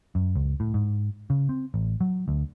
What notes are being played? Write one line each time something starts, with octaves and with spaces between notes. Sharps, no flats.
F#2
C#2
A2
G#2
C#3
C4
A1
F#3
D2